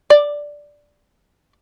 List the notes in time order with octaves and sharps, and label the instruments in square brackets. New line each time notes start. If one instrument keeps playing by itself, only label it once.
[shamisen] D5